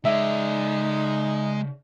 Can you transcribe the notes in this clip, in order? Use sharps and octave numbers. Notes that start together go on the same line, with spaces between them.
C#3 G#3 D#4 D5 E5